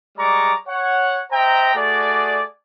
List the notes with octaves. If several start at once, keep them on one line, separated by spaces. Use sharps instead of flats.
G3 G#3 D5 A#5 C#6 D6
C#5 F#5
C5 D#5 E5 G5 A#5
A3 F#4 G#4 D5